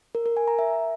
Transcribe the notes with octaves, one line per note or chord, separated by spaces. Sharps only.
A#4
A#4
G#5
A#5
E5